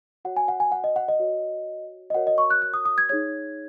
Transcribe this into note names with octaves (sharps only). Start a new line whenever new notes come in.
F#4 C#5 F#5
G#5
F#5
G#5
F#5
D#5
F#5
D#5
F#4 C#5
D#5
F#4 A#4 C#5 F#5
D#5
C#6
F#6
F#6
D#6
D#6
G#6
D#4 G#4 C#5 G#6